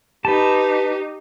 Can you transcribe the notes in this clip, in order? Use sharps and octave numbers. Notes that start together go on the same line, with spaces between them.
D#4 G4 B4 A5